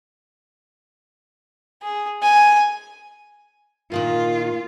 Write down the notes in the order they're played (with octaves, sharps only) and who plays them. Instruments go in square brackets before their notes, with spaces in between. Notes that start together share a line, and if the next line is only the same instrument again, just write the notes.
[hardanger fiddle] G#4
G#5
[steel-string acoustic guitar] A#2 D#3 A#3 [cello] F4